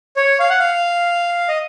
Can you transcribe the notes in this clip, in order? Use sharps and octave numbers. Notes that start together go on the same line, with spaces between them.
C#5
F5
F#5
F5
D#5